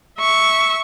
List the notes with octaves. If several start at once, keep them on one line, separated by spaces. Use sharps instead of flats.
E5 C#6